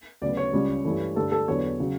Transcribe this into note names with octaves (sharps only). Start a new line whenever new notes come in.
D2 C#3 F#3 B3 D5
C#5
C#2 C#3 G3 C#4
G2 E3 A3
G2 D3 A3 A4
A4
E2 D3 F#3 B3 C#5
C#3 F#3